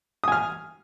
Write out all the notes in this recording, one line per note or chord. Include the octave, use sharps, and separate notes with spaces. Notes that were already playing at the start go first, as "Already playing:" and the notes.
G#5 D#6 F6